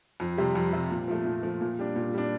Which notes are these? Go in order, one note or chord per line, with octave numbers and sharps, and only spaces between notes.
F2
C3 G3
F2
C3 G3
A#2
F3 A3
A#2
F3 A3
A#2
G3 D4
A#2
G3 D4